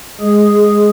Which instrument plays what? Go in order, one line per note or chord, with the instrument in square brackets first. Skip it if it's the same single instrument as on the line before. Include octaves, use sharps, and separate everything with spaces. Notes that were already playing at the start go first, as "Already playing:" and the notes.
[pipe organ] G#3 G#4